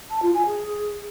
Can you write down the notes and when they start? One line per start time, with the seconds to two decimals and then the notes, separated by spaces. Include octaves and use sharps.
0.10 A5
0.22 F4
0.34 G#5
0.46 G#4